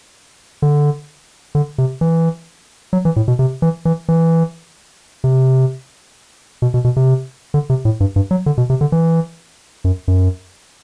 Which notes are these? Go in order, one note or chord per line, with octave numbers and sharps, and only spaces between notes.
D3
D3
C3
E3
F#3
E3
A2
B2
C3
E3
E3
E3
C3
B2
B2
B2
C3
D3
C3
A2
G2
G2
F#3
D3
B2
C3
D3
E3
F#2
F#2